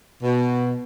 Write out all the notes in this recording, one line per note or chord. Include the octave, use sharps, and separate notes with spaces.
B2